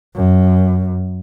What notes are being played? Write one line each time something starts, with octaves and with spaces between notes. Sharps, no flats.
F#2